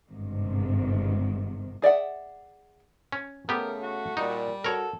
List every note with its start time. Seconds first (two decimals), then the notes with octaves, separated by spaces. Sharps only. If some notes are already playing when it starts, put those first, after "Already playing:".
0.10 G1 G#2 C3 D#3
1.82 G#4 D5 E5 F#5
3.12 C#4
3.49 C#3 A3 B3 G4 A#4
3.82 F#4
4.17 A#2 G3 D#4
4.64 F#4 A4 A#4 C#5